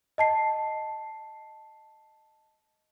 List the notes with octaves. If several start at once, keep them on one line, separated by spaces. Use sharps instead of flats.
D#5 A5 C7